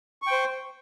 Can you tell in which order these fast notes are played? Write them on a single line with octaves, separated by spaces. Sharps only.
C#6 G5 C5